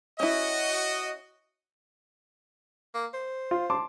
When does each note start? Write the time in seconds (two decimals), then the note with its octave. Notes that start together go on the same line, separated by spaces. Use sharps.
0.20 C#4 E4 F#4 D#5
2.94 A#3
3.13 C5
3.51 F4
3.70 A5 C6 D6